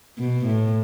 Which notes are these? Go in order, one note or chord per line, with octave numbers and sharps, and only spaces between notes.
B2
A2